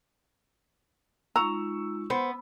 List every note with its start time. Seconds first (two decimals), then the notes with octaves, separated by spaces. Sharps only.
1.36 G#3 D#4 F4 A#5 C#6 E6
2.10 B3 C5